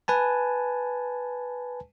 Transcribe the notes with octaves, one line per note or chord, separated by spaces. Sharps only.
B4 G#5 A5